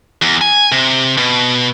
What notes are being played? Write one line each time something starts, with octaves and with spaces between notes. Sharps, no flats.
E2
G#5
C3
B2